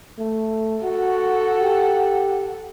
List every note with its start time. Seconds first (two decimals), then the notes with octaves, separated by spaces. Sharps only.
0.18 A3
0.83 F#4 A4 F#5
1.61 G4